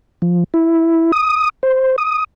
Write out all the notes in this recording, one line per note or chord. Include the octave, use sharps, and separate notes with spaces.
F3
E4
D#6
C5
D#6